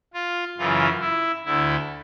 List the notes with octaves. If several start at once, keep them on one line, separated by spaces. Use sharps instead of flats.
F4
F#2 C#3 E3 F4
E4
D2 D3 E4